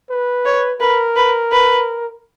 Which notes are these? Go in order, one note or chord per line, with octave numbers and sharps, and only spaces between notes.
B4
C#5
A#4 B4
B4
B4